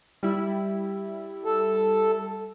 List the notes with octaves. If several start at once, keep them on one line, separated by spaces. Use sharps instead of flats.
G3 E4
A4